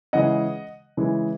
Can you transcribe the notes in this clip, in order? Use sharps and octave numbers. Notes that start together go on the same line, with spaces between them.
C#3 E3 G#3 D#5 F#5
C#3 E3 G#3